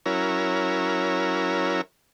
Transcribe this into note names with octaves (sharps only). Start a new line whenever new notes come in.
F#3 C#4 E4 A#4